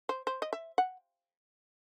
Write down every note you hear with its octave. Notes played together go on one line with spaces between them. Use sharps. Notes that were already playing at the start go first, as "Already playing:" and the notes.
C5
C5
D#5
E5
F#5